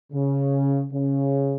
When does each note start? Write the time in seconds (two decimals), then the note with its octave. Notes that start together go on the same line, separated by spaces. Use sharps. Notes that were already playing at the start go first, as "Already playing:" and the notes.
0.13 C#3
0.92 C#3